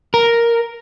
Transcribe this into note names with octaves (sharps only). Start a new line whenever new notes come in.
A#4